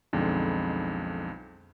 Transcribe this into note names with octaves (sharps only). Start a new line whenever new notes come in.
B1 F2 D3 G#3 D#4